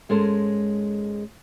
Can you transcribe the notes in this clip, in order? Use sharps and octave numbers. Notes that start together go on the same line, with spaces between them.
G#2 G#3 C#4 A4 A#4 C5